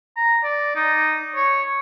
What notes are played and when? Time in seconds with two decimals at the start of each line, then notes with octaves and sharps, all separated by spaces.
0.17 A#5
0.43 D5
0.76 D#4
1.36 C#5